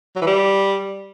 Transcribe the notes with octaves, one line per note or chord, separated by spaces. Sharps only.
F#3
E3
G3